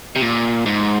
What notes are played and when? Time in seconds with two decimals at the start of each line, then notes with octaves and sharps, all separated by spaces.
0.16 C3
0.21 A#2
0.66 G#2